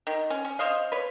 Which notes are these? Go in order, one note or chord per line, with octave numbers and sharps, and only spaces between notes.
D#3
C#4
C#4
C5 C#5 D#5 F5
B4 C#5